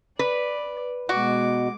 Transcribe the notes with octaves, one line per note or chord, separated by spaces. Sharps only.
B4 D5
B2 G#3 F#4 D6